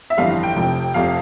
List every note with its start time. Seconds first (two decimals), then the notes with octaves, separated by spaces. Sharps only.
0.10 E5
0.17 G1 F2 E3 G3 F5
0.31 F5
0.43 G5
0.56 F1 F2 C3 F3
0.94 F1 F2 C3 F3 F5